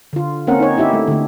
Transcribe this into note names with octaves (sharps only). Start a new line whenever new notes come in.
D3 F4
A#3 C4 C#4 A#4 F#5
D#4 C#5
D#4 E4 G4 E5
A3
D3 A3